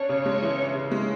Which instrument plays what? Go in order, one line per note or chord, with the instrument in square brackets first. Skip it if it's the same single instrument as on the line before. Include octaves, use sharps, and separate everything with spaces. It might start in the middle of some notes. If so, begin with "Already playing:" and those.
Already playing: [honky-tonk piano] C#4 D4 [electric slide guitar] C#5
[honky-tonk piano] C#3
G#3
E3
C#4
C#3
G#3